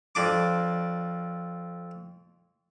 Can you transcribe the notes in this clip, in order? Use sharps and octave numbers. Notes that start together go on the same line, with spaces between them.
F2 D4 D6